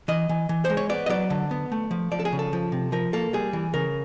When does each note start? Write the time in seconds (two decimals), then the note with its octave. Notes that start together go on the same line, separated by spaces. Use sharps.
0.08 E3 D#5
0.29 E3
0.49 E3
0.65 G#3 C5
0.77 C#5
0.89 B3 D5
1.06 D#5
1.09 F#3 D5
1.30 D3
1.51 B3
1.72 A3
1.91 F3
2.11 F3 D5
2.20 A4
2.25 G#4
2.33 C#3
2.39 A4
2.53 F3
2.72 C3
2.92 F3 A#4
3.13 A#3 A4
3.33 G3 G#4
3.53 E3
3.73 C#3 A#4